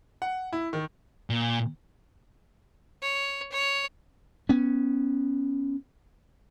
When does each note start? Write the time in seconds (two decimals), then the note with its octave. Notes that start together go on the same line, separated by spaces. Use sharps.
0.22 F#5
0.53 E4
0.73 D#3
1.30 A#2
3.02 C#5
3.52 C#5
4.49 B3 C#4